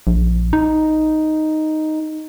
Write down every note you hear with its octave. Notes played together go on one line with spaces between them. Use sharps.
A#1
D#4